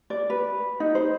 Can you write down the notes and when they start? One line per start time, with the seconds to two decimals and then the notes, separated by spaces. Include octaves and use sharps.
0.10 D5
0.30 B4
0.80 D#4
0.95 C5